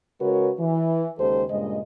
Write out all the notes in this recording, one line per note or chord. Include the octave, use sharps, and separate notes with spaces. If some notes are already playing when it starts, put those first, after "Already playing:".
C#3 G#3 F#4 A#4 B4 C#5
E3
D#2 C#3 G#3 G4 A4 C5
G2 A#2 C#3 G#3 D#5